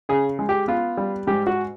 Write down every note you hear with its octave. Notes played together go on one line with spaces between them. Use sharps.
C#3 G#4
G#3
G4
B3 F4
G3
G#2 G4
F#4